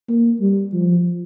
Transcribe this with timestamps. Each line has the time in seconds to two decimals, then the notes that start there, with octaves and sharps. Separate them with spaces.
0.08 A#3
0.41 G3
0.73 F3